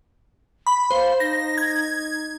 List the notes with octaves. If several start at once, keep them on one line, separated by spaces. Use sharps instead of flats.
B5
C5 F5
D#4 A#6
G#6